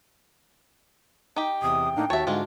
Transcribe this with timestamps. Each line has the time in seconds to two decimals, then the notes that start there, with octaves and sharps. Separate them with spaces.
1.36 D#4 G4 G5
1.62 E2 C3 D#6
1.96 A2 A#3 D4 D#4
2.10 D#2 F#4 C#5 E5 A5
2.27 G#2 D3 G#3 D4 F4